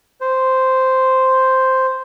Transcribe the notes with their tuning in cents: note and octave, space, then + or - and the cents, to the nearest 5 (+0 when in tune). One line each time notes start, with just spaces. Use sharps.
C5 -5